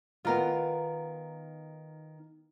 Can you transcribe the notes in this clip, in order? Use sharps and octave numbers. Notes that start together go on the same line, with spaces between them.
D#3 B3 F4 A#4